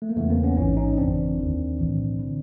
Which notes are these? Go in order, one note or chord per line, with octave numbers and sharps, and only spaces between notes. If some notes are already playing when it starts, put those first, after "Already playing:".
A3
A#3
E2 C#3 E3 A3 B3
A#3 C4
B3 C#4
A1 G#2 E3 C#4 D#4
C#4 D#4
G1 F2 C#3 E3 C4 D4
D#2 D#3
B1 A2 E3
D3